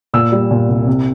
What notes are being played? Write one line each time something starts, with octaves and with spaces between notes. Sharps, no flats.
A#2 E6
G3
A#2
C2
C3